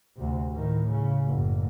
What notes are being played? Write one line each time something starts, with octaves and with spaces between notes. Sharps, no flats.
D2 C3
A2 D#3
C#3
F#1 A2